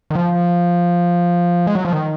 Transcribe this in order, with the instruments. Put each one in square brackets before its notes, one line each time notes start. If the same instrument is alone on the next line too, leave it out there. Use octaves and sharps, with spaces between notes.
[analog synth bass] D#3
F3
G#3
F#3
F3
D#3